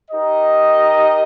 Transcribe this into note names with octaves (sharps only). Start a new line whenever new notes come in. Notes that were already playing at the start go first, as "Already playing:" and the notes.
D#4 G4 A#4 D#5